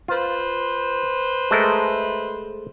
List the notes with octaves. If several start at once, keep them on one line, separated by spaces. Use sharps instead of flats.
F4 B4 C5
G#3 A3 A#4